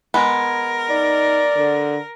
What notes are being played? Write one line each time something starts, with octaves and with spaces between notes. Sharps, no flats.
G#3 B3 A#4
D#4 D5
D3